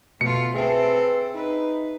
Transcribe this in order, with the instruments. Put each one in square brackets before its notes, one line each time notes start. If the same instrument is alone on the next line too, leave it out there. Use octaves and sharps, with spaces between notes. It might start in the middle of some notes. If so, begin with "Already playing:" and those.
[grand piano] B2 [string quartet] A3 F4 [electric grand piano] C#7
[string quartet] C4 A4 [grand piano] G#4 E5 [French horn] B4
[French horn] D#4 [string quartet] B4